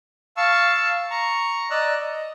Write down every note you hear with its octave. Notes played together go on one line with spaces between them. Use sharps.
F5 A5 C#6 E6
A#5 C#6
D5 D#5 A#5 E6 F#6
D#5